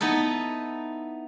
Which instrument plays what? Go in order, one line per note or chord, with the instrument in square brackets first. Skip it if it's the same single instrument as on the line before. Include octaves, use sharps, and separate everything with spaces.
[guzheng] B3 D#4 E4 A4